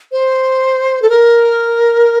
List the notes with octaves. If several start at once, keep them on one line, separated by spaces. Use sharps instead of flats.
C5
A4
A#4